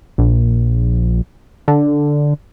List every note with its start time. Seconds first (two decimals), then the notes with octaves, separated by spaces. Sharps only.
0.18 A#1
1.68 D3